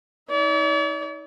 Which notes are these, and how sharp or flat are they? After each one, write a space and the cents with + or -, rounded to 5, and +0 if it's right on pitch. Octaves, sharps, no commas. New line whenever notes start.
D#4 +35 D5 -45